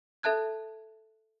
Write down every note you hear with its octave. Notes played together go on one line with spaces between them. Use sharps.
A4 E5 A5 F#6 G#6